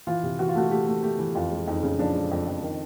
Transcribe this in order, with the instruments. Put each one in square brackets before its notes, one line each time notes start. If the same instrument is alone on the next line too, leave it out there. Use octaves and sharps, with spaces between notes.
[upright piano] E3 F4
C3
E3 F#4
F4
A3 F#4
A3 G4
A3
A3 G4
E3
F2 F4
G#3
F2 D#4
C#3
F3 D4
G#3
F2
F2
D#3